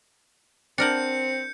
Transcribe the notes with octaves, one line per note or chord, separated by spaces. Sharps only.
C4 D4 A#4 F#5 G6 C#7